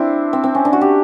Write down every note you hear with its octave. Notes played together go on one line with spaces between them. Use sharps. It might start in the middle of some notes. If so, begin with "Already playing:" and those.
Already playing: C4 D4 E4
C4
C4
C#4
D4
F#4
G4